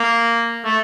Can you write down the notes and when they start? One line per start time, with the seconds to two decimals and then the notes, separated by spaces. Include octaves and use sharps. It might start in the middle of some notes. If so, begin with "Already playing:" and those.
Already playing: A#3
0.65 A3